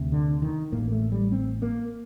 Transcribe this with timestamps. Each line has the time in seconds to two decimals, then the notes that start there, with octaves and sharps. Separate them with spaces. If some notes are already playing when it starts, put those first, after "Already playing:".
Already playing: D2 C3
0.12 D3
0.42 D#3
0.72 A1 A2 A#3
0.92 A3
1.12 G3
1.32 C4
1.62 A#3